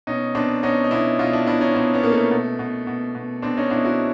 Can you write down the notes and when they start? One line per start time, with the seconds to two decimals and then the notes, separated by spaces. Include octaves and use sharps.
0.07 B2 C#4 D#4
0.35 B2 C4 D4
0.63 B2 C#4 D#4
0.84 D#4
0.91 B2 D4 E4
1.19 B2 D#4 F4
1.33 D4 E4
1.47 B2 D4 E4
1.61 C#4 D#4
1.75 B2 C4 D4
1.94 B3 C#4
2.03 B2 A#3
2.12 A3
2.31 B2
2.59 B2
2.87 B2
3.15 B2
3.42 B2 C4 D4
3.57 C#4 D#4
3.70 B2 D4 E4
3.85 E4 F#4